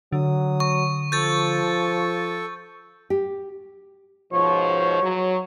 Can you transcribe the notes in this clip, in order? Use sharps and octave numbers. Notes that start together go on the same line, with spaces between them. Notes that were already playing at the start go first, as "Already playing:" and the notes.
D3 F#3 D#6
C#6
F3 A4 C#6 G6 A6
G4
G#2 B2 F3 C#5
F#3